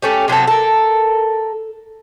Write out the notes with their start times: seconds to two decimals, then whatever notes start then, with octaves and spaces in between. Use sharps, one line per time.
0.02 A3 C#4 G4
0.28 C3 F#3 B3 A4
0.48 A4 A#4